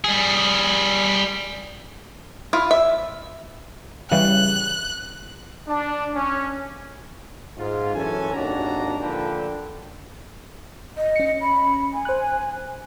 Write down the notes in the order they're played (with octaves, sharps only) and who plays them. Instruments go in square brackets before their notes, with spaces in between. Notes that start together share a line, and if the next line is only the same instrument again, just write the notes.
[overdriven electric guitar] G3 G#4
[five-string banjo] E4 F4
E5
[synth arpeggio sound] C#3 E3 G3 [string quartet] F#6
[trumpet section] D4
C#4
[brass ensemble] G#2 F4
F#2 E3 C#4 A4 G#5
G#1 D#2 D4 F#4 D5 A#5
A#1 A#2 D3 A4 B4 G5
[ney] D#5
[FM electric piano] C#4 C#7
[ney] B5
G#5
[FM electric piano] C5 F#6